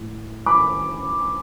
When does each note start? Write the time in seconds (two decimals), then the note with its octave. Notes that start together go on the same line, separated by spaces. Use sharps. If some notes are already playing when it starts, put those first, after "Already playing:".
Already playing: A2
0.46 B5 D6